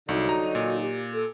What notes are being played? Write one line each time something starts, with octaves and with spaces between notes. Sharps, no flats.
C2 D3 F#3 D#4 F#4
A#5
A#2
G4
A4